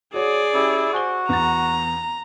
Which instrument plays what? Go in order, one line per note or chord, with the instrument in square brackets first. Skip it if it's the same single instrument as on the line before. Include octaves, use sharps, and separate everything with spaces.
[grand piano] F#4 C#5 [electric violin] G#4 D5
[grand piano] C#4 G4 [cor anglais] E4
[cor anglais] F#4 [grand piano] C5 G#5 G7
[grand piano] E2 A6 [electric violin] A#5